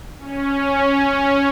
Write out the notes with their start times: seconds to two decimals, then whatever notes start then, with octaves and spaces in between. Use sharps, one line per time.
0.19 C#4